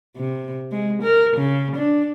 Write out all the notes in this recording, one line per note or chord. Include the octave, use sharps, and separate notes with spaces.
C3
G#3
A#4
C#3
D4